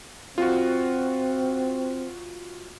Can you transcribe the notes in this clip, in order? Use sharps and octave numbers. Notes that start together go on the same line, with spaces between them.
C4 F4 F#4